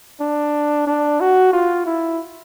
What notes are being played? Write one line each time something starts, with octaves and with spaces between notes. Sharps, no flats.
D4
D4
F#4
F4
E4